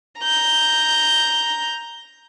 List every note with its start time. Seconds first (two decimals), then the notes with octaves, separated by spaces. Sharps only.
0.20 A#5 G6